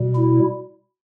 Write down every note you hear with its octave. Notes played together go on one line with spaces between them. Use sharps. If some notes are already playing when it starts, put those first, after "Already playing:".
Already playing: B2 G3
E4